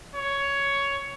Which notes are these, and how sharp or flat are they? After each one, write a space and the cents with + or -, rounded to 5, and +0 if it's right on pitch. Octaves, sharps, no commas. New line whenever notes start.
C#5 +10